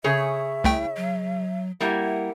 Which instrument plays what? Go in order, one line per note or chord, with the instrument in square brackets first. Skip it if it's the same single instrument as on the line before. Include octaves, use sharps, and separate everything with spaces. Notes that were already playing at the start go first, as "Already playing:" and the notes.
[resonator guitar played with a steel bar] C#3 G#4 C#5 [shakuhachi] E5
[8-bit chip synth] C2 A3 G5 [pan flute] E4
[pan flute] F#3
[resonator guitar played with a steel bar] G3 A#3 E4 [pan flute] F#5